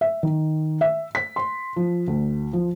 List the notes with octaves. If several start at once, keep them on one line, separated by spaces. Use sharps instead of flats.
E5
D#3
E5
B6
C6
F3
D2
F3